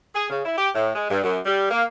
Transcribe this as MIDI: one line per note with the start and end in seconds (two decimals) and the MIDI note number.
0.14 0.28 68
0.29 0.40 49
0.44 0.56 64
0.57 0.69 67
0.75 0.91 45
0.95 1.07 56
1.10 1.19 43
1.23 1.38 42
1.45 1.67 55
1.70 1.84 58